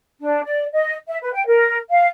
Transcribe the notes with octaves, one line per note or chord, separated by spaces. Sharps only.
D4
D5
D#5
E5
B4
G5
A#4
F5